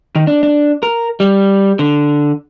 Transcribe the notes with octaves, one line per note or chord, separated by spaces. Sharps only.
D#3
D4
D4
A#4
G3
D3